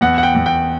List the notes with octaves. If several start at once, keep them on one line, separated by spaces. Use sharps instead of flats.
E2 F#5
F#5
G5
E2
G5